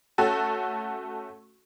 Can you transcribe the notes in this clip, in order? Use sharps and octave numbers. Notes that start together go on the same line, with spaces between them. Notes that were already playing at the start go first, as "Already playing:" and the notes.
A3 C#4 F#4 A4